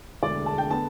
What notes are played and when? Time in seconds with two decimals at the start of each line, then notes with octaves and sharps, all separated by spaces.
0.23 E1 D2 D3 D5
0.46 A5
0.58 G5
0.70 D3 B3 D4 A5